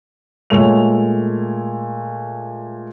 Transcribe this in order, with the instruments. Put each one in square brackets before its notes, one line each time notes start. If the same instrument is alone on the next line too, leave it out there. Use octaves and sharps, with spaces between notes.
[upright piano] A#2 G#3 A3 C#5 F7